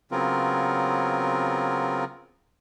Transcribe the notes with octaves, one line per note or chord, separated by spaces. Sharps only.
C#3 F#3 B3 C4 F4 A#4